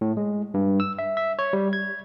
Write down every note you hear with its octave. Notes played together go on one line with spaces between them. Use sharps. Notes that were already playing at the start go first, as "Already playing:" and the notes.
A2
G#3
G2
E6
E5
E5
C#5
G3
G#6